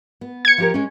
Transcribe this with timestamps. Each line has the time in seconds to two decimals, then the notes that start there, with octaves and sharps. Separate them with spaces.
0.21 B3
0.45 G#6 C#7
0.58 F3 G4 A#4
0.74 G#3 C#4